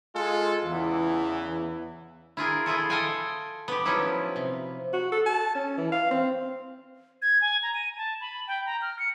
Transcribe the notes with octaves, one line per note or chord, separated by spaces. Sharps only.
G#3 F4 A4
E2 C#3 E3
E4 F4 G#4 A#4
E4 F4 G#4 A4
A4 D#5 F5 G5 G#5
B3 G4
F3 F#3 B3 C#4 D#4 E4
C3
F#4
A4
A5
C#4
E3
F5
C4
G#6
G#5
A#5
D#7
A5
B5
G5
A#5
F6
C#7